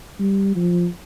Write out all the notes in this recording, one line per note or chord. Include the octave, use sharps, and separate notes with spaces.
G3
F3